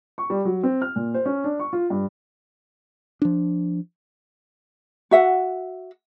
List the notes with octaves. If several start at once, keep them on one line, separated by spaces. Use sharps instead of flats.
C#6
G3
F#3
C4
F6
A#2
C5
C#4
D4
C#6
F4
G2
F3 D4
F#4 E5 F#5